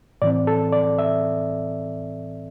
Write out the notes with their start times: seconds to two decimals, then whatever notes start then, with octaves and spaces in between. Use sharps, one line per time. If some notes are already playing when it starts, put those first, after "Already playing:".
0.22 A2 E3 C4 D5
0.47 A4
0.72 D5
0.99 E5